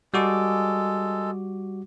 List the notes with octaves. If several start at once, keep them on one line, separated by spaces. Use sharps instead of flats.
G3 G#3 F#4 A4 D6